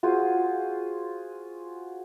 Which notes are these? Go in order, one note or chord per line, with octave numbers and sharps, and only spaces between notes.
F4 F#4 G#4 C5